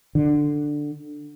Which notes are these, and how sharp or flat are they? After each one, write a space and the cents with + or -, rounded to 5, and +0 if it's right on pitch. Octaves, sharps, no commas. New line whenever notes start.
D3 +10